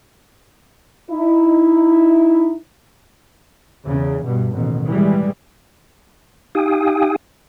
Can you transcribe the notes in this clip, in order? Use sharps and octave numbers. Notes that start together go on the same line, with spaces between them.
D#4 E4
E2 C#3
G2 B2
A1 D#2 B2
E3 G3 G#3
D#4 G4 F5 G5 G#5 D#6